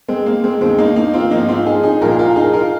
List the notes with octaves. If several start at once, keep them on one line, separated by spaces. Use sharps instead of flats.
G#3 C4
A#3
G#3 C4
D#2 D#3 G#3 C4
A#3 D#4
A#3 D#4
C4 F4
G#2 F3 A#3 D#4
C4 F4
D#4 G#4
D#4 G#4
C2 A#2 F3 F4 A#4
F4 A#4
D#4 G#4
F4 A#4